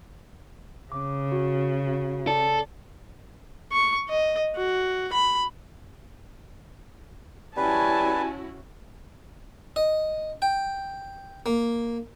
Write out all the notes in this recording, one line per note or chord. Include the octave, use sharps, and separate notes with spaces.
C#3 D6
F#4
F#4
A4 D5
C#6
D#5
F#4
B5
G3 C#4 E4 F#4 B4 G#5 A5
D#5
G5
A#3